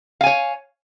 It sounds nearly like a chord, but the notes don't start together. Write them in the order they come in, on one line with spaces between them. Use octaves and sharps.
F5 G#5 C#5